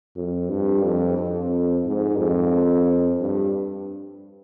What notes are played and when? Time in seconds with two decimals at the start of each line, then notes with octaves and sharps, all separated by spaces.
0.16 F2
0.50 G2
0.83 F2
1.17 F2
1.86 G#2
2.19 F2
3.21 G2